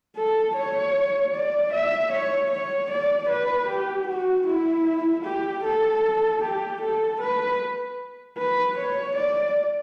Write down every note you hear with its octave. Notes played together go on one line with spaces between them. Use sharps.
A4
C#5
D5
E5
C#5
C#5
D5
B4
G4
F#4
E4
G4
A4
G4
A4
B4
B4
C#5
D5